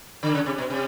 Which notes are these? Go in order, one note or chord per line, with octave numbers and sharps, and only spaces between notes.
D3
C#3
C3
B2
C3